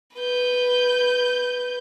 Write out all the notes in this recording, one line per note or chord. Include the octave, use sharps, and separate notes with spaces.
B4 G6